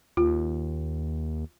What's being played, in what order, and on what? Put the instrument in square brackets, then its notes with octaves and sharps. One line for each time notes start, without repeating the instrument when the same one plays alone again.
[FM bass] D#2 [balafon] F4